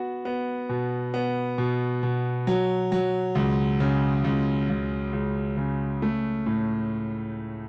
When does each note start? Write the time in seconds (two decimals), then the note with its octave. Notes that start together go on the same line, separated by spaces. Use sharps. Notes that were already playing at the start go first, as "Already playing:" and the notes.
Already playing: B3 F#4
0.25 B3
0.69 B2
1.14 B3
1.58 B2
2.03 B2
2.47 F#3
2.92 F#3
3.35 C#2
3.80 C#3
4.24 C#2
4.69 C#2
5.13 C#2
5.57 C#3
6.02 A3
6.46 A2